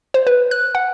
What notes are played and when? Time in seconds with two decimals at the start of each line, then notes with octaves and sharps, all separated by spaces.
0.14 C5
0.27 B4
0.51 F#6
0.75 F#5